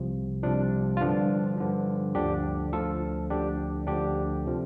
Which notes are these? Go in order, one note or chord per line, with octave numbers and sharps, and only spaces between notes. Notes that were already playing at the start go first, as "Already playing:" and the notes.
Already playing: C2 C3 F3
C2 C3 F3 D4
F4
G2 D3 F3 D4
G2 D3 F3
D2 D3 F3 D4 G4
D2 D3 F3 F4 A4
D2 D3 F3 D4 G4
D2 D3 F3 D4 G4
C3 F3